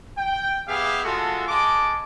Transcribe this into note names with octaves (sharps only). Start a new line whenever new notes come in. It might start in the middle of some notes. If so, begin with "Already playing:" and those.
G5
B3 G4 G#4 E5 F5
G#3 A3 F4 F#4 A4
G#3 A5 D6